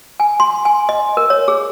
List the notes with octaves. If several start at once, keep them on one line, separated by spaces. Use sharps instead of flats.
G#5
C6
G#5
D#5
A#4
C#5
G#4